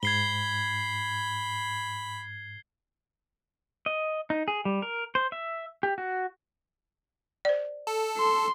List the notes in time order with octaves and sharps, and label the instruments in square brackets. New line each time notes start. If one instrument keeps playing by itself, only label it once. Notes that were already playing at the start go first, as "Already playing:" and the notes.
[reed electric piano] G#2 [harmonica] B5 [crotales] G#6 C7 G7
[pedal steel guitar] D#5
D#4
G#4
G3
A#4
C5
E5
G4
F#4
[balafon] C5 D5
[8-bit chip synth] A4
[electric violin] C6